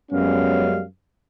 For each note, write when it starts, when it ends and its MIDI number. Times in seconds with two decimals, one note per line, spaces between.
0.12 0.83 42
0.12 0.83 55
0.12 0.83 56
0.12 0.83 59
0.12 0.83 61
0.12 0.83 77